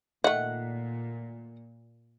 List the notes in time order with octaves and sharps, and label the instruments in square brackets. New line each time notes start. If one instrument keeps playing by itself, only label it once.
[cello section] A#2 [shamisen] D#3 A3 [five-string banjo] F#5